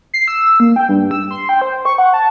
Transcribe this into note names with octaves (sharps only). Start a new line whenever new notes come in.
C7
E6
A#3
G5
G2
E6
C6
G5
C5
C#6
F#5
A5